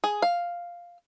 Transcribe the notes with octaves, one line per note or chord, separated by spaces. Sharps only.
G#4
F5